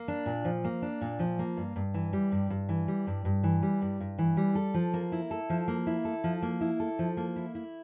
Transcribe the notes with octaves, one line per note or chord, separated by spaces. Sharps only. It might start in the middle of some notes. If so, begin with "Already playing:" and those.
Already playing: A#3
D4
A#2
F3
A#3
D4
A#2
F3
A#3
G2
G2
E3
G3
G2
G2
E3
G3
G2
G2
E3
G3
G2
G2
E3
G3
A4
F3
A#3
E4
A4
F3
A#3
E4
A4
F3
A#3
E4
A4
F3
A#3
E4
E4